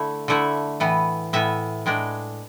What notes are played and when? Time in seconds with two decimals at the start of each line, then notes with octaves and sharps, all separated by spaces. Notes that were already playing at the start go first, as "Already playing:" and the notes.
Already playing: D3 A3 E4
0.28 D3 A3 E4
0.80 A2 E3 B3
1.33 A2 E3 B3 E5
1.86 A2 G#3 D4